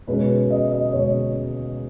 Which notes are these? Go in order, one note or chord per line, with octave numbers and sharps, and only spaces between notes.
B2 G#3 C#4 B4
D#5
D#5
B2 G#3 C#4 C#5